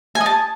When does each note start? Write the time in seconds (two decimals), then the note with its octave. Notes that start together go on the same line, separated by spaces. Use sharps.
0.15 G#5
0.21 D#5
0.26 A5